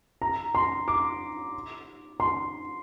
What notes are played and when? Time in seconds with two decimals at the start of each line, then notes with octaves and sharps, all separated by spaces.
0.22 A#5
0.55 C6
0.88 D6
2.20 C6